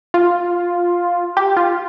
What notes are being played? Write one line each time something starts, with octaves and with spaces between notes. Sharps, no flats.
F4
G4
F4